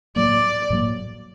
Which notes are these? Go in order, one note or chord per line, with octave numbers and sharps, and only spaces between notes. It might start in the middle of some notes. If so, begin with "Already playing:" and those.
A2 F#3 A#3 D5
A2 F#3 A#3